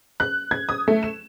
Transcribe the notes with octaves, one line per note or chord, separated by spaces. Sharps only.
F#6
G#6
D#6
A3
E7